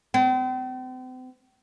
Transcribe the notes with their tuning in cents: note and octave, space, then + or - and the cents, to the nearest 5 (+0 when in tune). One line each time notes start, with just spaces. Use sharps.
C4 -40